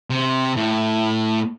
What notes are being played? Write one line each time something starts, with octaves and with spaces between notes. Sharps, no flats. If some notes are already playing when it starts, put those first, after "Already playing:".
C3
A2